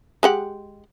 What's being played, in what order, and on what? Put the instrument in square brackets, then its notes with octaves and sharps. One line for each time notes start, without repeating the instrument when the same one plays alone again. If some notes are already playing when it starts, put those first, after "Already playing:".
[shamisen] G#3 G4 F#5